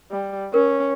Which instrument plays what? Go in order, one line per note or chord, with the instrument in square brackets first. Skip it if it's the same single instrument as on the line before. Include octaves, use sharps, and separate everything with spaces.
[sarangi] G3
[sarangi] C#4 [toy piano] A#4